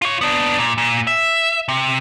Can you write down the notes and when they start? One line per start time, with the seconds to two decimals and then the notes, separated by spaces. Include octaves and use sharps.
0.02 F4 C#5
0.21 B3 D4
0.59 A#2
0.78 A#2
1.07 E5
1.68 C3